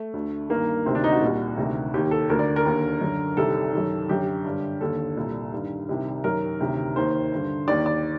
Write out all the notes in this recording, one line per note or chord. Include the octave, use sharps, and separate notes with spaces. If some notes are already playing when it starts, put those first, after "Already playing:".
Already playing: A3
D2 D3
G2 D#3 A#3
D2 C3 D#3 C4
D4
D#4
F#4
C2 A#2
D2 C3 D#3
D#2 D#3 G4
A4
D2 D3 A#4
D5
A#4
D#2 D3
F#2 D3
C2 C3 D#3 A4
F#2 D#3
F#2 D3 G4
G2 D3
D#2 D3 A4
C2 A#2
G2 D#3
C2 C3 D#3
F#2 D#3 A#4
D2 C3 D#3
D#2 D#3 C5
G2 D3
D#2 D#3 D5
D5